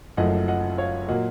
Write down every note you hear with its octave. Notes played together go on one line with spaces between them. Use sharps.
F#1 F#2 F3 A3 D#5 F#5
D#5 F#5
C#5 F5
A#2 F#3 A#3 D#5 F#5